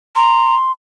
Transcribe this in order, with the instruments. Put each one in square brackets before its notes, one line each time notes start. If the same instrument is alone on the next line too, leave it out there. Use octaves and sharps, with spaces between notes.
[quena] A#5 [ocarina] C6